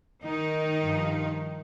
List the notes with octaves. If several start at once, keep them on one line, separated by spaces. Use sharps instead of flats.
D#3 D#4
G2 F3